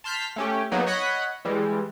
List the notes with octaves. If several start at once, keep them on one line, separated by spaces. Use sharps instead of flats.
A5 C6 F6 G6 B6
A3 C#4 G4
F#3 A#3 B3 D#4 G#4
C#5 D#5 F#5 B5 F#6
E3 G3 G#3